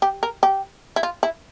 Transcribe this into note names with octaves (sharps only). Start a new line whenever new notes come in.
G4
A#4
G4
E4
F4
E4